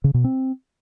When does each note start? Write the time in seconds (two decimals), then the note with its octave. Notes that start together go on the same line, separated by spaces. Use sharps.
0.04 C#3
0.14 B2
0.24 C4